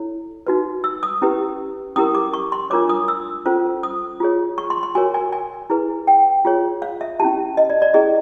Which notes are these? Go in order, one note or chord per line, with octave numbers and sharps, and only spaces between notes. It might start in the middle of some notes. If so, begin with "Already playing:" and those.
Already playing: E4 A4 C#5
D#4 F#4 B4
E6
D#6
C#4 E4 G4 B4
C#4 E4 G4 A#4 D#6
D6
C#6
C6
D4 F4 A#4 C#5 D6
D#6
E6
C#4 F4 A4 C5
D#6
F4 G#4 C#5
C#6
C6
C6
F#4 A#4 C#5 G#5
G#5
G#5
E4 G#4 B4
G5
F4 G#4 C#5
F5
E5
C#4 E4 G4 A5
D#5
D5
D5
C#4 E4 G#4 D#5